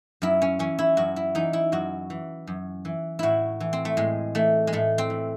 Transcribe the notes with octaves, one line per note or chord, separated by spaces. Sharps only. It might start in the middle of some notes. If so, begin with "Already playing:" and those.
F#2 E4
C#4
E3 C#4
E4
F#2 F#4
E4
E3 D#4
E4
F#2 F#4
E3
F#2
E3
A2 E4 F#4
E3
C4
A3
A2 G#3
E3 A3
G#3
A2 A3
C4
E3